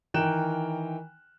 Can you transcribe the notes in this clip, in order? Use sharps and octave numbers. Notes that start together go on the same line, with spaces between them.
D#3 E3 A#4 G5 F#6 E7